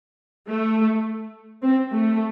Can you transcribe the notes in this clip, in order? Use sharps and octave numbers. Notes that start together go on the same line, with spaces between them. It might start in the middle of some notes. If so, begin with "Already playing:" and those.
A3
C4
A3